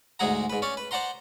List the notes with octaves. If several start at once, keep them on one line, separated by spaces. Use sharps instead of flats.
D2 G#2 G#3 G#4 F#5 A#5
G#2 B4
C#4 C#5 D5
B4
C5 D5 F#5 A#5 C6